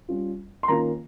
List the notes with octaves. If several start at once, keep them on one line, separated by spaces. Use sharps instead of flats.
G3 C#4 F4
C6
D#3 A#3 C#4 F4 A#5